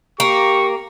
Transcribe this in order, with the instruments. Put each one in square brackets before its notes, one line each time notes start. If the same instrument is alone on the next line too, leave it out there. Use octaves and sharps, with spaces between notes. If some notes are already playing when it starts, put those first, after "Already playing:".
[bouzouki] A#3 [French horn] G4 [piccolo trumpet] C#6